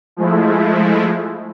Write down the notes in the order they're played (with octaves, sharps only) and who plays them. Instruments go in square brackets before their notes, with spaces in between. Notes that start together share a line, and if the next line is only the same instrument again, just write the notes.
[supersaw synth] F3 G#3 A3 E4